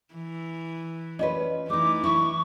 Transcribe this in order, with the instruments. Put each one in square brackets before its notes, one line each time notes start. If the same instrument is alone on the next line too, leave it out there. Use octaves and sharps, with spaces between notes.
[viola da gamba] E3
[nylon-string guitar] C#4 F4 B4 [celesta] D5 D#5
[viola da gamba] E3 [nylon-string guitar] A3 D#4 [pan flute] D6
[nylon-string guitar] E4 [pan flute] C#6